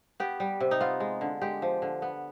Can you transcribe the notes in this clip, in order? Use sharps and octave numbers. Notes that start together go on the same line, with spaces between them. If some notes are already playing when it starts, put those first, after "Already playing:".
B3 G4
G3
C3
D#4
B3 F4
G#3
D3
G#3 G4
F3
D3
B3